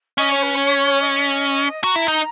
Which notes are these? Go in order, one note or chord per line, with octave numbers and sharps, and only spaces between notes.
C#4 D#5
C#5
B4
C#5
D#5
F#4 A#5
E4
D#4